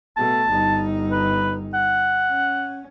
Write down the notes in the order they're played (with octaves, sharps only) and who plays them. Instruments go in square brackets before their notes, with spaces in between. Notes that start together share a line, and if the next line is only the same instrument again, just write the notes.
[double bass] B2 A3 [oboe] A5
[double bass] G1 D#4
[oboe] B4
F#5
[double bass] C#4